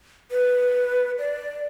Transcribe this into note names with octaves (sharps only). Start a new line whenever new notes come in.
B4
D5